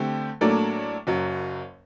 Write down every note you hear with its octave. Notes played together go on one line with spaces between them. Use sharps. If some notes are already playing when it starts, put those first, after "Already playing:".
Already playing: D3 A3 C4 G4
A2 F#3 A#3 D4 A4
F#1 F#2 F#3